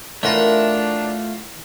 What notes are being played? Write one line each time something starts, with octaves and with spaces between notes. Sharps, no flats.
E3 A3 D4 F4 A#4 C#5 F#5 A#5